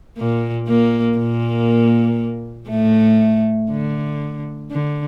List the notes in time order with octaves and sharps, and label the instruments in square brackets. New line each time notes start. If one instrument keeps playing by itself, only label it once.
[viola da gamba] A#2 A#3
A#2 A#3
A#2 A#3
A2 A3
D3
D3